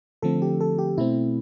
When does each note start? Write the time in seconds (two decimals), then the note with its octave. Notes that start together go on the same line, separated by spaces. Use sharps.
0.22 D3 F3 A3 C4 A4
0.42 G4
0.61 A4
0.78 G4
0.98 B2 A3 C4 E4